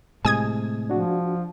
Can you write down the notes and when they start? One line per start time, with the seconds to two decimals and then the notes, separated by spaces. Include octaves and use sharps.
0.25 A2 C3 G#3 G#5 D#6 G#6
0.90 F3 D4 F#4